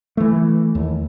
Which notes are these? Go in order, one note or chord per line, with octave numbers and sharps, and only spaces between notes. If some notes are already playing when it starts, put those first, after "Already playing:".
E3 A3
D#2